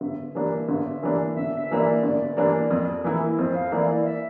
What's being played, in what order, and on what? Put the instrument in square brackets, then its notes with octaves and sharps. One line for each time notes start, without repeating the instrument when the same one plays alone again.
[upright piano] G1 [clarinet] E5
[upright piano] G2 E3 A#3 D4
G1
G2 E3 A#3 D4
[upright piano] G1 [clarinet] E5
[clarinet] E5
[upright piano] G2 E3 A#3 D4
[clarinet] D5
[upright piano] G1 [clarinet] D5
[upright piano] G2 E3 A#3 D4
F2
E3 A#3 E4
[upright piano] F2 [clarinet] C5
[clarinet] F5
[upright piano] E3 A#3 E4 [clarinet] D5
[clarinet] D5
E5